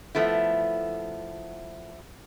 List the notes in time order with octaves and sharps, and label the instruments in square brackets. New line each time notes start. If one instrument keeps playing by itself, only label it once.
[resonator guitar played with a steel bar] F3 A3 B3 E4